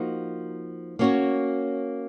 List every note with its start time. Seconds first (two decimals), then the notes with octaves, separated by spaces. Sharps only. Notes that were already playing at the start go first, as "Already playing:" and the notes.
Already playing: F3 A#3 D#4 F#4
0.99 A#3 C#4 F#4 C#5